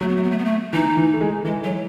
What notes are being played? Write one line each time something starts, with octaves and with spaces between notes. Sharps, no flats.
F#3 A3
B3
A3
B3
A3
B3
A3
E3 D#4
E3
A3
G#3
E3 G#3
F#3